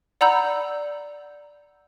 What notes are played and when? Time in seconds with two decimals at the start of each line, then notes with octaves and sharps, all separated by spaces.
0.21 D5 F#5 A#5 B5 E6 G6